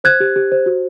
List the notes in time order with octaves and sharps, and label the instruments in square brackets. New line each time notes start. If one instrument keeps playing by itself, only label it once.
[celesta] C5 F#6 G#6
G4
G4
C5
F#4